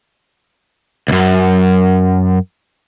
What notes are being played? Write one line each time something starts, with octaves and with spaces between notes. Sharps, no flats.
C#2 F#2